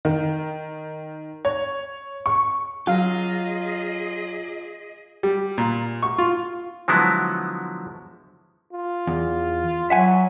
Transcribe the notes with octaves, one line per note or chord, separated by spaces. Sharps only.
D#3
C#5
C#6
F#3 F4 G#4 D#5 F5
G3
A#2
C#6
F4
D3 F3 F#3 G#3 B3 E4
F4
E2
F#3 E5 F#5 G#5